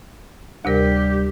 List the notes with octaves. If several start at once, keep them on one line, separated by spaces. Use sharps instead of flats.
D2 C3 G3 G4 A#4